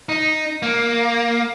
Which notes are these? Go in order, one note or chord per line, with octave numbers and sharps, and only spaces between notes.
D#4
A#3